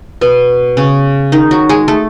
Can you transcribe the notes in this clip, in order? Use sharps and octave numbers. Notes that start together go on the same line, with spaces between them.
B2 B3
C#3 C#4
D#3 D#4
F#3 F#4
G#3 G#4
A3 A4